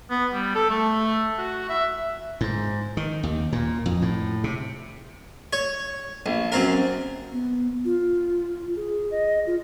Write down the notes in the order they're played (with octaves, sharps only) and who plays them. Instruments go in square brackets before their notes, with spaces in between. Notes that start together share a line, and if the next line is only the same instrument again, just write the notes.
[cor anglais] B3
G3
A4
A3
F#4
E5
[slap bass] G#2
D#3
D#2
A#2
F2
A2
C3
[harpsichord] C#5
A#1
F#2 C4 A#4
[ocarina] B3
F4
G#4
D#5
F4